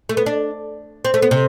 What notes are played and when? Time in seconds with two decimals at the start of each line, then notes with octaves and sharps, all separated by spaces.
0.09 A3
0.17 B3
0.26 D4
1.05 C4
1.14 A3
1.22 B3
1.31 C3